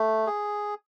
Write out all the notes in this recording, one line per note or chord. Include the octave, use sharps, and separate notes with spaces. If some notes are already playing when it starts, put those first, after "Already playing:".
Already playing: A3
G#4